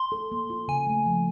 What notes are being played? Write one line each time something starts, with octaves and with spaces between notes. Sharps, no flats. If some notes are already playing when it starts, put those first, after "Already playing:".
Already playing: C6
A4
A#3
F4
C#3 G#5
A3
F3